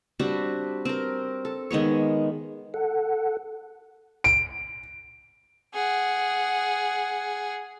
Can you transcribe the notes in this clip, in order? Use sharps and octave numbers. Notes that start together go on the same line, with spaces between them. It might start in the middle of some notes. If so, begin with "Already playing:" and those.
G3 C4 D4 F#4
C4 A#4
A4
D#3 G#3 B3 C#5
A4 F#5
D7
G#4 F#5